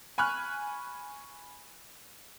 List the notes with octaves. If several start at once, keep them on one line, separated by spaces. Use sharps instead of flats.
G#5 B5 C#6 F6 F#6